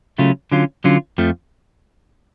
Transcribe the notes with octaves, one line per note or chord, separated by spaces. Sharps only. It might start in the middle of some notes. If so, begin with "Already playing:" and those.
C#3 F#3 A3 C#4 F4
D3 F#3 C#4 F4
D3 F#3 C#4 F4
F2 F3 A3